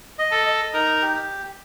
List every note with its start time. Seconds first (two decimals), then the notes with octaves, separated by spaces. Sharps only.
0.18 D#5
0.31 A4
0.46 D#5
0.74 D#4 A#4
1.02 G4